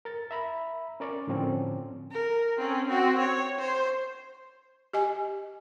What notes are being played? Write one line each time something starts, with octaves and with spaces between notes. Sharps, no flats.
A#4 A6
E5 A#5 B5
C#4 A#4 D5 C#6
A2 D3 F3 C4 C#4
A#4
C4 C#4
C4 F#4
C#5
C5
G4 D#5 G#5